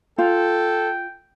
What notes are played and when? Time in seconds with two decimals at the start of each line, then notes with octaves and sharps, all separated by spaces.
0.18 F4 A4 G5